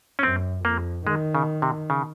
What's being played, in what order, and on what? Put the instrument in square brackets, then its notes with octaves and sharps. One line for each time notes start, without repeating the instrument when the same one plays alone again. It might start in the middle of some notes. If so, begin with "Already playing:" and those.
[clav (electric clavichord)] C#4
[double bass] F#2 [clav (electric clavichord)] C4
[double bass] F2 [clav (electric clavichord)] A#3
[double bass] D#3 [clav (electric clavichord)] G#3
[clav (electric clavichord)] C#3
C3
C#3